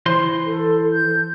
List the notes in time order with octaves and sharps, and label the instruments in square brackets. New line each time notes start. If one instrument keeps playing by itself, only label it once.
[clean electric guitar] E3 C5 C6
[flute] A4
G6